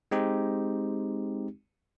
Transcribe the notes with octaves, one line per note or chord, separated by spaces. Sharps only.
G#3 C4 D#4 G4